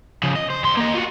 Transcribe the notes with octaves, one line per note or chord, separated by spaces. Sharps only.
C#3 F3
D#5
C5
E2 C6
A#3 D#5
F4 F#4